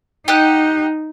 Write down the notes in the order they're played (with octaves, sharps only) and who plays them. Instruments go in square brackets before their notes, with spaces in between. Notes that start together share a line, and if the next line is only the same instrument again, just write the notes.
[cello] D#4 [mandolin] G4 D#5 F#5